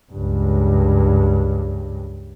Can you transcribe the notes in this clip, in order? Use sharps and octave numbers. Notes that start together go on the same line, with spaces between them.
C#2 G2